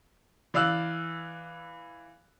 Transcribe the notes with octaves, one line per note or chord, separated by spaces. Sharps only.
E3 D5 F5 E6 F#6